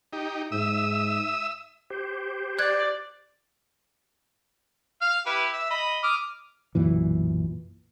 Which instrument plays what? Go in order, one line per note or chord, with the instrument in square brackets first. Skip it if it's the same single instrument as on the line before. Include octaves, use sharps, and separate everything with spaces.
[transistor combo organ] D#4 G4
[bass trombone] G#2 [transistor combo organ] E5 D#6 E6
[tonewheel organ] G4 C5
[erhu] D5 [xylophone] F#6 G#6
[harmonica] F5 F6
E4 G4 B4
E5
D#5 B5
D6 D#6 F6
[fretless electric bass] B1 F#2 A#2 E3